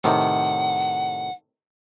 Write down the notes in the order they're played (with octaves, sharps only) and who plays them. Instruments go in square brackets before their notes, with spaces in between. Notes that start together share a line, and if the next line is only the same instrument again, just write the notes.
[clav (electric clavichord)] A2 C3 D#3 [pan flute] F#5